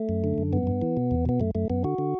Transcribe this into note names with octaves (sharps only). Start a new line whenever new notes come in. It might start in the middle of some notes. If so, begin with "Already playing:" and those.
Already playing: A3
F#2
D3
F#2
G2 B3
G2
E3
B2
E2
B2 B3
F#2 A3
F#2 A3
F#2 B3
D3 F#4
D3